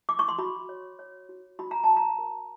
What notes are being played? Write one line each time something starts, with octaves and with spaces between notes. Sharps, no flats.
D6
C#6
C6
F#4 B5
C#5
C#5
F#4
F#4 B5
A#5
F#4 A5
A#5
A#4